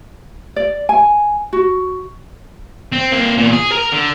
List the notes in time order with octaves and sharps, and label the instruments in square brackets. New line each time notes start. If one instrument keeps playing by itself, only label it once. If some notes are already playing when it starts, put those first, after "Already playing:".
[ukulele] D5
G#5
F#4
[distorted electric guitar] C4
A#3 C4
E2 A#2
G#4
A#4 A#5
D3